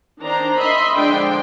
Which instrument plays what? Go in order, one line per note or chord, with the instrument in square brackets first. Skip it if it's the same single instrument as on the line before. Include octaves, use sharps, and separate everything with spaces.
[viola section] D#3 D4 C5 A#5
D#5 E5 B5 C6
D3 F3 G#3 D4 G5 C6